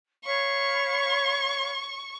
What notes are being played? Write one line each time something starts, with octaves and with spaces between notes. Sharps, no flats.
C#5 F5 B5 C#6